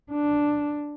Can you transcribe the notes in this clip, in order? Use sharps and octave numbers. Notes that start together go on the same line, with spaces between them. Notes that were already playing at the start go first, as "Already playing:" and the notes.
D4